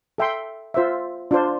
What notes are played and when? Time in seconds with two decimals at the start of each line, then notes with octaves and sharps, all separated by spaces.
0.18 A4 E5 G5 C6
0.74 F4 C5 E5
1.31 D4 F4 C5